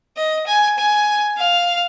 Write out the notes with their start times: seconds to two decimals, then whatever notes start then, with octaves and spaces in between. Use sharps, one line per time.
0.17 D#5
0.47 G#5
0.78 G#5
1.37 F5